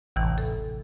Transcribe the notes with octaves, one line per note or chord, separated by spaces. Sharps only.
A1 D#2 C3 E3
A4